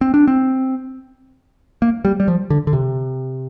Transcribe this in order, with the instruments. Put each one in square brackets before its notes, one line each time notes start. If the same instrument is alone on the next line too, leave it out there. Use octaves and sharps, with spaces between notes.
[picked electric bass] C4
D4
C4
A#3
G3
G3
F3
D3
D3
C3